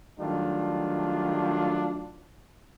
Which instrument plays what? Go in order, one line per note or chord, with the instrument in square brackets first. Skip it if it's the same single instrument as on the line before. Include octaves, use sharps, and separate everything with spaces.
[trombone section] D#3 F#3 G3 A3 D4 F4